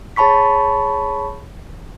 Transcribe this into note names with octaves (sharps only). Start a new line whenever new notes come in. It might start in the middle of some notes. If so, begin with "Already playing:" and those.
G#4 C#5 A5 B5 C#6 B6